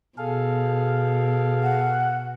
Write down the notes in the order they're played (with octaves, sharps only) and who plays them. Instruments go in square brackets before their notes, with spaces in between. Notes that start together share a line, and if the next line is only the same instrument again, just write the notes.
[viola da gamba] B2 [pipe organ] G#4 A4 F5
[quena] F#5